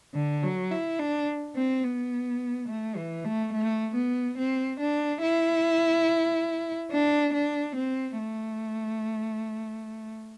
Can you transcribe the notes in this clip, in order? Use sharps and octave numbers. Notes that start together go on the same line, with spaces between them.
D3
F#3
E4
D4
C4
B3
A3
E3
A3
A3
B3
C4
D4
E4
D4
D4
C4
A3